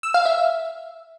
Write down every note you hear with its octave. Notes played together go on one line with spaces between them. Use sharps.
E6
F5
E5